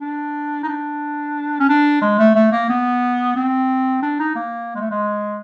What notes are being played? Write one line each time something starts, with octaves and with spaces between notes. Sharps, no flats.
D4
D#4
D4
C#4
D4
G#3
A3
A3
A#3
B3
C4
D4
D#4
A#3
G#3
A3
G#3